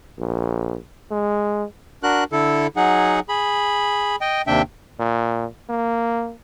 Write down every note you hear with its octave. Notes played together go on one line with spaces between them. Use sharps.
A#1
G#3
D4 F#4 A#4 F#6
D3 E4 A4
F#3 D#4 G#4 F#5
G#4 B5
D#5 G5
D#2 C3 D4 E5 G5
A#2
A#3